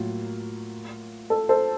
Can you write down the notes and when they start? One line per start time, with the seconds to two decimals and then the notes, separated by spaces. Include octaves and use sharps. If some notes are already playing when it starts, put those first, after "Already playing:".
Already playing: A2 F#3 A#3 F4
1.30 A4
1.49 A4 C5